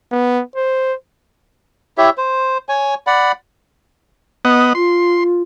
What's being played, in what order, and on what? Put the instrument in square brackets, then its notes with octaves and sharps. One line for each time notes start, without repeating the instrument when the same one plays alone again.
[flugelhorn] B3
C5
[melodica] E4 G4 C#5 E5
C5
C#5 G#5
D5 F#5 B5
[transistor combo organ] B3 D#5 F#5
[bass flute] F4 [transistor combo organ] C6